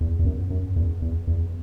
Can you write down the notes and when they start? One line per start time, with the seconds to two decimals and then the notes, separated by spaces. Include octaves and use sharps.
0.01 E2
0.19 E2
0.25 F#2
0.50 F#2
0.76 E2
1.02 E2
1.27 E2